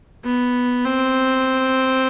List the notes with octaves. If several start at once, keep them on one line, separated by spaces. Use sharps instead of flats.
B3
C4